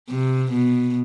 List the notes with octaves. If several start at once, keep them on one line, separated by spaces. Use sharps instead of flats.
C3
B2